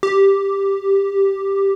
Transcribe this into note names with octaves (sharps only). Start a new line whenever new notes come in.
G4